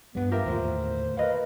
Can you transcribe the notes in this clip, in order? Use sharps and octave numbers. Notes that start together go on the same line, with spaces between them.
G2 G3 B3
F4 G4 A#4 E5
D#2 A2 D3 C5
A#4 B4 D#5 F5